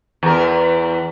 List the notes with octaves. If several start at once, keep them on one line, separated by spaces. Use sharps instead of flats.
E2 A#4